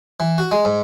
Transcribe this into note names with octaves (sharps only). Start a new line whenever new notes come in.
E3
F#4
G#3
G#2